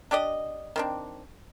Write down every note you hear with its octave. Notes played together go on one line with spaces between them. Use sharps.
D4 G4 D5 D#5
D#3 C4 D4